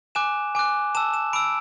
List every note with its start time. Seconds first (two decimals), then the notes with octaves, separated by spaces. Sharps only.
0.15 G#5 D6 F#6 E7
0.55 G#5 D6 F#6
0.95 A5 E6 E7
1.14 E7
1.33 B5 E6 D7